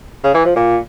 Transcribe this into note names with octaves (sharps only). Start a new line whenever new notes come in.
C#3
E3
F3
A#2